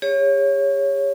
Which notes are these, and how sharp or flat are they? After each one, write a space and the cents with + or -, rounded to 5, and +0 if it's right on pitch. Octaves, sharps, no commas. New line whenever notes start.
G4 +45 C#5 +0